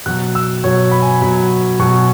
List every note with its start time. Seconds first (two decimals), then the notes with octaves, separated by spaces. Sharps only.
0.06 B2 F#3 F#6
0.35 E6
0.64 B2 C#5
0.67 F#3
0.92 B5
1.02 G#5
1.22 B2 F#3 B5
1.79 B2 F#3 C#6